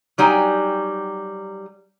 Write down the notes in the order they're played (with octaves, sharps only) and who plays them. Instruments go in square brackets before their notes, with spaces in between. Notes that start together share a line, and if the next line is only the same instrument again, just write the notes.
[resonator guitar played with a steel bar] F#3 G3 D#4 G5 G#5